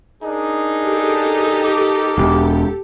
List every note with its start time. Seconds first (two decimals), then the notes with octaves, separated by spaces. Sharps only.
0.23 D4 D#4 G#4 A#4
0.82 G4 A4
1.63 A#4 D6
2.18 E1